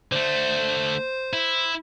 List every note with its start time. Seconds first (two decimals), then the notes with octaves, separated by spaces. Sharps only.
0.12 D3 A3 C5
1.33 E4